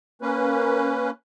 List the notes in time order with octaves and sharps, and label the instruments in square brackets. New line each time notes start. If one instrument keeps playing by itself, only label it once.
[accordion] A#3 C#4 B4